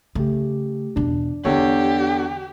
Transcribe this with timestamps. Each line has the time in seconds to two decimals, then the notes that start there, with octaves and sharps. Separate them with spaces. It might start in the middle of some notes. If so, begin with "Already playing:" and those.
0.15 C#3 A3 G4
0.96 E2 B2 D4
1.45 E2 D3 C#4 G4 C#5